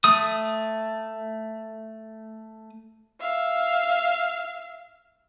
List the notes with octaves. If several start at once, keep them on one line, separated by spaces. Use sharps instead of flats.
A3 D#6
E5 F5